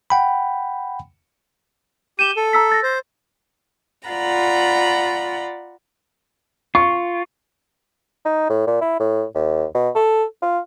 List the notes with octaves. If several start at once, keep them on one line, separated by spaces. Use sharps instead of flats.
F#5 G5 B5
G4 G6 D#7 E7 G7
A4
A#5 E6 B6
E6 A6 A#6
C5
F4 D5 F#5 A#5 B5
F4 C#6
D#4
A2
A#2
E4
A2
D#2
B2
A4
F4